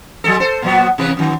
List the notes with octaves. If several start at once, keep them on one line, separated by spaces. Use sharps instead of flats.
F#3 G#3 A4
A4 C5
A#2 F#3 B3
C3 E3 B4
F#2 D#3